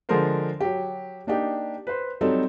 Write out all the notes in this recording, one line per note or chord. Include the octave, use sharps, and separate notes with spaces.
D3 F3 G#3 F4 A#4 C5
F#3 G4
A#3 D4 D#4 G4
B4 C5
F#3 G3 C4 D#4 A4